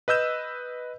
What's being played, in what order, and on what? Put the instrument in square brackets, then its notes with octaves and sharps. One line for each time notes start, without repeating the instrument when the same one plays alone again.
[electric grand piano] B4 D#5 E6 G6 E7